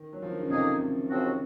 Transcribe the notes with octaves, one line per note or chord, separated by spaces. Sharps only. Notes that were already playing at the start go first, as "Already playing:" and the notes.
Already playing: D#3
F#3
F3
D#3
C#3
F2 C3 D#3 A#3 D#4 G#4
C3
D#2 C#3 F3 C4 F#4